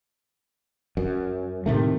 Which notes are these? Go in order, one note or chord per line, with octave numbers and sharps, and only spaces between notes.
F#2
A2 C3 D#3 A3